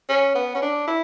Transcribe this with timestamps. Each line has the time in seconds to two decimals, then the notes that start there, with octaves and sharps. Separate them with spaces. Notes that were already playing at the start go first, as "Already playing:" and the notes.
0.09 C#4
0.35 B3
0.55 C#4
0.62 D4
0.88 E4